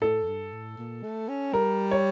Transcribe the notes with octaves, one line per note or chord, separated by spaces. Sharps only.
A2 A4
F2
G2
A2
A#2
A3
C#4
G3 A#4
C#5